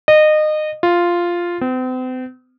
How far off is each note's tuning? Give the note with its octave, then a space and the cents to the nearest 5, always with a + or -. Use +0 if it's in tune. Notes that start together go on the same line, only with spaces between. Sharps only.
D#5 -25
F4 -5
C4 -40